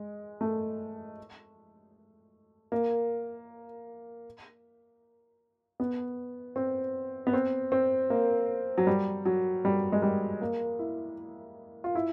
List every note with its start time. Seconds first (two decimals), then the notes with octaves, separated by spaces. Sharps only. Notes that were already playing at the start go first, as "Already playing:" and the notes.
Already playing: G#3
0.41 A3
2.72 A#3
5.80 B3
6.56 C4
7.27 B3
7.33 C4
7.72 C4
8.10 A#3
8.78 F#3
8.87 G3
9.25 F#3
9.65 G3
9.92 G#3
10.02 G3
10.42 A#3
10.79 E4
11.84 F4
11.95 E4